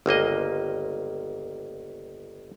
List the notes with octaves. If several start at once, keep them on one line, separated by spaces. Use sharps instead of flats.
G1 C#2 A#3 D#5